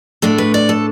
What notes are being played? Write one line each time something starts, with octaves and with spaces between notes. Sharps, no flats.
A2 A3 D4 A4
B4
D5
A4